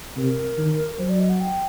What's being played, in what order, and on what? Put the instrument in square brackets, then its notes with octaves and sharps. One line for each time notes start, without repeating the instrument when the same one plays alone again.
[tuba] C3 [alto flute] A#4
[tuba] D#3
[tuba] F#3 [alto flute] C5
[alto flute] D5
D#5
F#5
G5